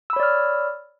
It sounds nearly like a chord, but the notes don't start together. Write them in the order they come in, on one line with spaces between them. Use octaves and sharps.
E6 B5 C#5 D5 F6